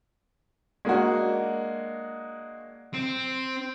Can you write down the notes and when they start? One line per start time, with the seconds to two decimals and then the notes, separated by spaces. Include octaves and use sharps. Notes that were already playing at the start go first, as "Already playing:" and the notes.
0.85 G#3 A#3 D4 F#4
2.94 C4